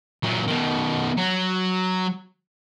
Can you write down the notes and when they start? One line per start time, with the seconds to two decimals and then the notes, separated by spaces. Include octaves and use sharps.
0.24 A#2 F#3
0.48 B2 D#3
1.18 F#3